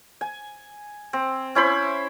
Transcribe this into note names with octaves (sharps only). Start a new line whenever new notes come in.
G#5
C4
C#4 E4 C5 B5